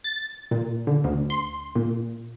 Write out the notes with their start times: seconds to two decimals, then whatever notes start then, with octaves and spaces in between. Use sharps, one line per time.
0.04 A6
0.51 A#2
0.87 D3
1.04 D2
1.30 C6
1.75 A#2